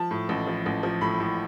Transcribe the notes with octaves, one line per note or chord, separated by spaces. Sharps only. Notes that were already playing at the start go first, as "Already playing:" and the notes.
Already playing: F3 A5
A2
A1
F3
A1
F3
A2 B5
A2